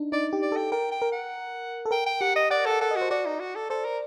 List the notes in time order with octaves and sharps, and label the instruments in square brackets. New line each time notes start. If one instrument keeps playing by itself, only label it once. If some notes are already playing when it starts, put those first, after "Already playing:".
Already playing: [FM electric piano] D4 D#4
[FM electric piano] D#4 [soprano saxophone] D5
[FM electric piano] G4
[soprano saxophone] D5
[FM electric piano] A4 [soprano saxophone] G5
[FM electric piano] A#4 [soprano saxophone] G5
[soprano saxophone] G5
[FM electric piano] A#4
[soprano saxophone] F#5
[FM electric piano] A4
[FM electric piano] A#4 [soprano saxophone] G5
[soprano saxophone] G5
[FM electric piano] G4 [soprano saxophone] F#5
[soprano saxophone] D#5
[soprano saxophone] D5 [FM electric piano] F#5
[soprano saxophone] A4
[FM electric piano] F#5
[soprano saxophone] A4 [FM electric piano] F#5
[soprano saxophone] F#4 [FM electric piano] D#5
[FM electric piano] C5
[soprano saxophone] F#4 [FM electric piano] D5
[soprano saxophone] D#4
F#4
A4
[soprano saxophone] A4 [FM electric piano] C5
[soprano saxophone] A#4